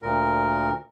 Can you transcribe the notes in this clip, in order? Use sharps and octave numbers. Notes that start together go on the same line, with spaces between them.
D2 A#2 A#4